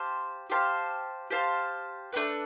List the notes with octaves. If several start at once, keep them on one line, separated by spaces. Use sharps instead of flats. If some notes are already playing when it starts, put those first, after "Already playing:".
Already playing: G4 C5 F5 A5
G4 C5 F5 A5
G4 C5 F5 A5
A3 D4 G4 B4